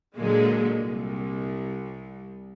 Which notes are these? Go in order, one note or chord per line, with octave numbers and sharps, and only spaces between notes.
A#2 D3 F#3 G#3 A#3
C2